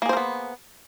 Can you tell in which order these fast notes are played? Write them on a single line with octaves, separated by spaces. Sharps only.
A#3 G#4 C5 A#4 B3